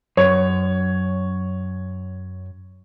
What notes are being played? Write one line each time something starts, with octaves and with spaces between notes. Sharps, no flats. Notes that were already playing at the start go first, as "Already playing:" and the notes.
F#2 C#5